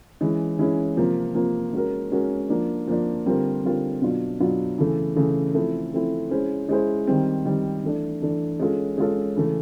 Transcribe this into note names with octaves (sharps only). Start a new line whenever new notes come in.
E3 G#3 C#4 E4
E3 G#3 C#4 E4
C3 F3 A#3
C3 F3 A#3
G#3 C#4 F#4 A#4
G#3 C#4 F#4 A#4
F3 A#3 D4
F3 A#3 D4
D3 G3 C4 F4 A#4
D3 G3 C4 F4 A#4
B2 F#3 B3 D4 F4
B2 F#3 B3 D4 F4
C#3 E3 A3
C#3 E3 A3
F3 A3 C4 E4 A4
F3 A3 C4 E4 A4
G#3 C#4 E4 G#4 C5
G#3 C#4 E4 G#4 C5
D#3 G3 C4
D#3 G3 C4
E3 A3 D4
E3 A3 D4
G#3 C#4 F4 A4
G#3 C#4 F4 A4
C#3 E3 A3